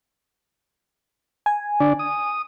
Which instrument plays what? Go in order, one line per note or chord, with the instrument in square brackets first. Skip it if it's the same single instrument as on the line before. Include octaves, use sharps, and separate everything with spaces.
[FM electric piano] G#5
[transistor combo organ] D3 D4 D5
D#6